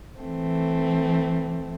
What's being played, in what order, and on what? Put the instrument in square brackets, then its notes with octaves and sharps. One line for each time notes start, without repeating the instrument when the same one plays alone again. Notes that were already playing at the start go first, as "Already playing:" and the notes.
[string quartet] E3 A3 C4